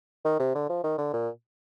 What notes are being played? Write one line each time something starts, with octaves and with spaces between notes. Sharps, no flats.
D#3
C3
D3
F3
D#3
D3
A#2